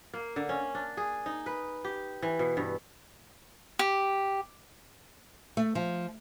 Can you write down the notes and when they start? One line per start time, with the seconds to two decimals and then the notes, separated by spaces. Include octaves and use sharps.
0.14 A#3
0.36 D3
0.49 C#4
0.75 D4
0.97 G#4
1.26 D#4
1.46 B4
1.85 G4
2.22 E3
2.39 B2
2.57 G2
3.79 G4
5.57 A3
5.75 F3